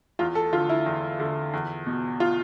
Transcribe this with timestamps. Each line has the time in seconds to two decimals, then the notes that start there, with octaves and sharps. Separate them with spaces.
0.19 E2 F4
0.35 A4
0.53 D3 F4
0.69 E4
0.86 E2
1.20 D3
1.53 E2
1.86 B2
2.20 F4